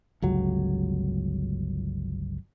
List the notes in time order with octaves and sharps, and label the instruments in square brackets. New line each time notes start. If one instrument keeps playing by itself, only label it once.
[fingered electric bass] G1 C#2 F#3